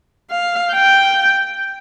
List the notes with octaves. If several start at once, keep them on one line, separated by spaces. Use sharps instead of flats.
F5
G5